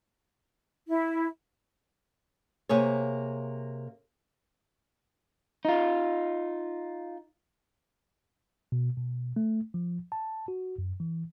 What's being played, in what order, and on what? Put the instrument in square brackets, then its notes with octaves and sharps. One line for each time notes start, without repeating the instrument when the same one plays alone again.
[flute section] E4
[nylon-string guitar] C3 A#3 G#4 C#5
[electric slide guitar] D#4 F4
[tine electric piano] B2
B2
A3
F3
A5
F#4
F#2
E3